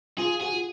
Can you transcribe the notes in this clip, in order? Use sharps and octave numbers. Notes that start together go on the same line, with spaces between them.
F4 G#4
F#4 G#4
F4